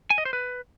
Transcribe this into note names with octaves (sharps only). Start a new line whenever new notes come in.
G#5
D#5
C5
B4